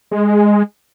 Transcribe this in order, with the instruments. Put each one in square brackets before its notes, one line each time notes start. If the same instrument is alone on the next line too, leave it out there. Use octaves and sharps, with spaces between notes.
[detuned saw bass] G#3